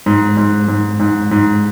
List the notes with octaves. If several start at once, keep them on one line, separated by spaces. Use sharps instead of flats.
G#2
G#2
G#2
G#2
G#2